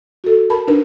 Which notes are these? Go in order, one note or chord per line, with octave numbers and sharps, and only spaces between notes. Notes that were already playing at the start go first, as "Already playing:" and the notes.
F#4 A4
A#4 A5 B5
D4 D#4 A#4 B4